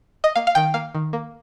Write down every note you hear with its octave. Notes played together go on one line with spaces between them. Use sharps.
D#5
A#3 F5
F5
D#3 G5
A#3 F5
D#3
A#3